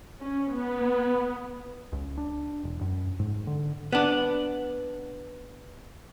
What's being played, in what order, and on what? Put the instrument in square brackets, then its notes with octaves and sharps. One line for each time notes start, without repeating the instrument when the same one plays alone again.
[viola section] C#4
B3
[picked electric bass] C#2
D4
E1
F#2
G#2
D3
[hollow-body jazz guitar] B3 D4